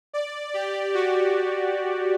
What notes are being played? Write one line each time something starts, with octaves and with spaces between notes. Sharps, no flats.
D5
G4
F#4